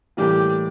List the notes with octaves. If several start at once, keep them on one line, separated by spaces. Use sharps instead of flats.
A2 E3 G3 A#3 G4